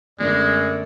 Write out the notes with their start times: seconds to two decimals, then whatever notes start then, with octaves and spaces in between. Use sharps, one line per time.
0.20 F#2 D3 G#3 A3 B3 D5